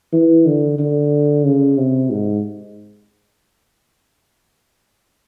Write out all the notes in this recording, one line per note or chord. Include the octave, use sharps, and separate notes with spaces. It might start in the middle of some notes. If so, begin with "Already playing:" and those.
E3
D3
D3
C#3
C3
G#2